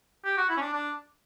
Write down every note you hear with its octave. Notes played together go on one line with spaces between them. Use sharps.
G4
F#4
E4
C#4
D4
D4